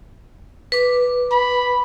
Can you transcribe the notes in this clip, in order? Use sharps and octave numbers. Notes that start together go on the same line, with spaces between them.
B4 D6
B5